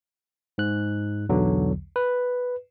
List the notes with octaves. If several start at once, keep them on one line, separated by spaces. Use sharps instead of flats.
G#2 F#6
B1 E2 D3 F#3
B4